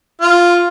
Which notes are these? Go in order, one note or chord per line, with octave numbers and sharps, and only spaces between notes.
F4